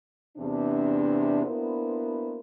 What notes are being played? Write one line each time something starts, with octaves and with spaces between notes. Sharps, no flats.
E2 C3 C4 D4
A#3 B3 D4 E4 F#4 C5